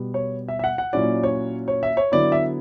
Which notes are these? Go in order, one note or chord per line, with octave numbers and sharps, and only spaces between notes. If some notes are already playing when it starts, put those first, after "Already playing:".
Already playing: B2 G3 B3
C#5
E5
E5
F#5
F#5
A#2 F#3 C#4 E4 D5
C#5
C#5
E5
C#5
D3 F#3 B3 E4 D5
E5